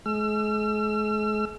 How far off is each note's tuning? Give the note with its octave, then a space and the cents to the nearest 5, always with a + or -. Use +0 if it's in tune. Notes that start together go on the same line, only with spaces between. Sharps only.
G#3 +40 E6 +45